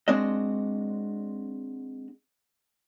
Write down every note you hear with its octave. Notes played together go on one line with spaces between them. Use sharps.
G#3 C4 D4 F#4 D#5